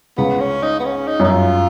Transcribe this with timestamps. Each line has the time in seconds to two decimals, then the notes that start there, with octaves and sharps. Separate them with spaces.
0.17 C#2 C#3 B3
0.40 C#4
0.63 D#4
0.80 B3
0.86 C#4
1.08 D#4
1.20 F#2 D#4
1.30 F4